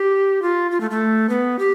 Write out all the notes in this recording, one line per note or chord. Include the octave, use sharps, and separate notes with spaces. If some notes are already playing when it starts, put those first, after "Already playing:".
Already playing: G4
F4
F4
A3
A3
B3
G4